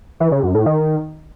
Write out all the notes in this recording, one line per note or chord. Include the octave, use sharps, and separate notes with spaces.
E3
C#3
F#2
A2
D#3